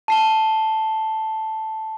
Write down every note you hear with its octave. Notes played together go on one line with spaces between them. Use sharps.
A5 C7 G7